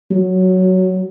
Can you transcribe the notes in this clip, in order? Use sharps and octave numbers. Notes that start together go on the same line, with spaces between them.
F#3